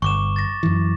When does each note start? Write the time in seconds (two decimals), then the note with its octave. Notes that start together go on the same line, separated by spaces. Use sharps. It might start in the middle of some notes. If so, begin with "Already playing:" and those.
0.02 G1 C#6 D6 E7
0.36 A6 A#6
0.63 F#2 E3